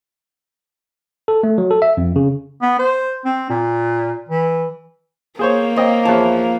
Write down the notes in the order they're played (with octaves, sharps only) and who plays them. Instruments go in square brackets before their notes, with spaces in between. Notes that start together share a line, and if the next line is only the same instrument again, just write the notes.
[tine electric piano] A4
A3
F#3
A4
E5
F2
C#3
[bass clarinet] B3
C5
C4
A#2
E3
[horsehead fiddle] A#3 [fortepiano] G#4 C5 C#5
[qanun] C4 [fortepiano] C#5 D#5 G5
[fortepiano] E2 C#5 A5 [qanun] F3